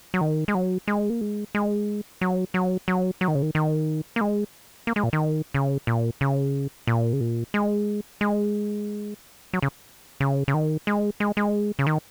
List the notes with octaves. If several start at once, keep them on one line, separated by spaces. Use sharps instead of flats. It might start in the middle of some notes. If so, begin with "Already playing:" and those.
F#3
D#3
G#3
F#3
G#3
A#3
G#3
G#3
F#3
F#3
F#3
F#3
D#3
C#3
D#3
D#3
A#3
G#3
A#3
G#3
A#2
D#3
C#3
A#2
C#3
A#2
C#3
A#2
G#3
G#3
F#3
C#3
C#3
C#3
D#3
G#3
G#3
G#3
C#3
D#3